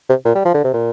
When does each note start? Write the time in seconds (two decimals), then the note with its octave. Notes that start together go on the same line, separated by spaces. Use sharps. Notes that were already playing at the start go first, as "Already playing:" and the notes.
0.09 C3
0.25 A#2
0.35 G3
0.45 F3
0.54 D3
0.64 C3
0.73 A#2